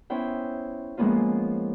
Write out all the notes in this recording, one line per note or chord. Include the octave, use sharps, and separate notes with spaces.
B3 C#4 E4 C5 G5
F3 G#3 A#3 B3 C#4 F4